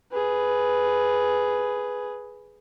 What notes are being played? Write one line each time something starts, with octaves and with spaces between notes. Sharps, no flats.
G#4 B4